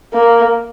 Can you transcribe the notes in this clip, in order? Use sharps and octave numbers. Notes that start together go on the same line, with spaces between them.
A#3